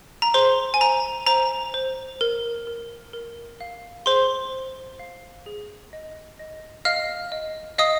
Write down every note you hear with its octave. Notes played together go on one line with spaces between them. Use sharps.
A#5
G#4 C5 C6
G#5
C5 A#5
C5 A#5
C5
A#4
A#4
A#4
F5
G#4 C5 C6
C5
F5
G#4
D#5
D#5
D#5 F5 F6
D#5
D#5 F5 D#6